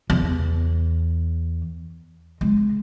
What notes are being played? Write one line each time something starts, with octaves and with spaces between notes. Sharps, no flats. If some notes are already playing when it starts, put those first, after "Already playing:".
E2
G#3